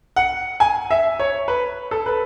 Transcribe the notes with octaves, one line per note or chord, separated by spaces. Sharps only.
F#5
G#5
E5
C#5
B4
A4
B4